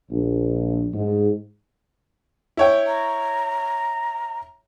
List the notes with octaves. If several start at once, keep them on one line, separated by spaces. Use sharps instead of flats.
A#1
G#2
E4 C#5 G5
A#5